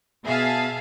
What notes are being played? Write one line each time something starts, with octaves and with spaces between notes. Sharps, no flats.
B2 G#4 E5 F5 A5